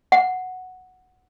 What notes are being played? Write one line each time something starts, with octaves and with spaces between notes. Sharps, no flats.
F#5